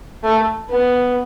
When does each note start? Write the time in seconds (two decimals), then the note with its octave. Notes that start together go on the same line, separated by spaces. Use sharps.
0.24 A3
0.70 B3